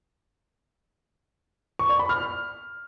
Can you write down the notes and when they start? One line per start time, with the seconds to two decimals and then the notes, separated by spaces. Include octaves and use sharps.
1.79 C#6
1.89 D5
1.99 B5
2.09 F6